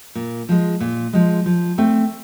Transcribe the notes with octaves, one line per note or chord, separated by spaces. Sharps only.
A#2
F3 G#3
A#2
F3 G#3
F3
A3 C4